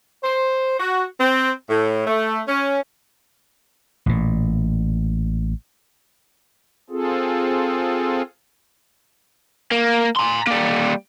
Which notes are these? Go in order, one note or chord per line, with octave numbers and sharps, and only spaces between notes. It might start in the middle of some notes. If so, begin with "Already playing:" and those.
C5
F#4
C4
A2
A3
C#4
A1 A#2
C4 F4 G#4 A4
A#3
A#5 C6
G3 A#3